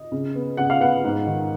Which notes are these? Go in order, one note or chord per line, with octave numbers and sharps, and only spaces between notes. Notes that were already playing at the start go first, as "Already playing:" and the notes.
Already playing: D#5
C#3
B3
C#3 F#5
F5
B3 F#5
G#2
D#3